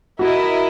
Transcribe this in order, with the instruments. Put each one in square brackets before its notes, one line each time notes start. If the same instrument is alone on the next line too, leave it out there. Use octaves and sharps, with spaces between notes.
[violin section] E4 A#4 D#5 [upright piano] F#4